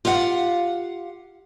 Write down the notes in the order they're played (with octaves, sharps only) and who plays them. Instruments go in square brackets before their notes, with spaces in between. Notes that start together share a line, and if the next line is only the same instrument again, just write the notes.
[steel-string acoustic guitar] F4 G4 F5 F#5